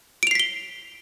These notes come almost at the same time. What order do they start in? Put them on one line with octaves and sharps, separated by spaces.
D7 F7 C7 B6 G7